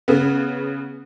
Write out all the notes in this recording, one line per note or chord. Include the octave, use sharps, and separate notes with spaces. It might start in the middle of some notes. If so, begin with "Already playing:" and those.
C#3 B3